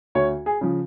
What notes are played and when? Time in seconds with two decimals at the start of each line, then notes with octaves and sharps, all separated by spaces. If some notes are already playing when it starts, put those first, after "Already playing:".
0.15 D2 C#5
0.46 G#4
0.61 C#3 F3